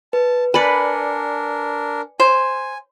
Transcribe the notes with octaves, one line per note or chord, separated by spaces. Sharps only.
B4 A5
D4 A#4 B4 D5 G#5 C#7
C5 G#5